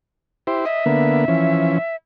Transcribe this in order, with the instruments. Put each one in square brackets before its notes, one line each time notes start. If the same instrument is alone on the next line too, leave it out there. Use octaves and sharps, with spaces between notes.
[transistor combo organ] E4 G4 C5
[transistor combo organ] D#5 [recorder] E5
[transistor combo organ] D3 A#3 B3
E3 F3 C#4